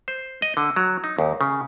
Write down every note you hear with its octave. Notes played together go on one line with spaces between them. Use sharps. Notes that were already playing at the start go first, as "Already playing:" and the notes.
C5
D#5
D3
F#3
D#4
D#2
C#3